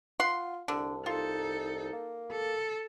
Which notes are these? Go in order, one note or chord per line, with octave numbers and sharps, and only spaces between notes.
F4 F#5 C6
C2 D3
D#4 F4 A4
A#3
A4